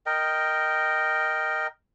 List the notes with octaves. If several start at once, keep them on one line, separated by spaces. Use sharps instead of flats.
A#4 D#5 G5